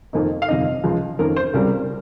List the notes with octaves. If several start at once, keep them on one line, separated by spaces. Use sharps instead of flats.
F2 D#3 A#3 D#4
F5
G1 F2 C3 D#3 D#5
C#2 C#3 F3
F2 D#3 A#3 C#4 A#4
C5
C#2 C#3 G3 C4 A#4